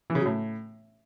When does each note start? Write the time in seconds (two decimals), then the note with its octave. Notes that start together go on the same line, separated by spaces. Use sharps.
0.10 E3
0.15 C#3
0.20 F#3
0.26 A2